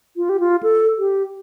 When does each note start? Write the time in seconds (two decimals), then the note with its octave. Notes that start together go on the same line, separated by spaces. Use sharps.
0.17 F4
0.29 G4
0.40 F4
0.63 A4
0.99 G4